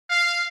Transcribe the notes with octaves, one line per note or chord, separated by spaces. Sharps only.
F5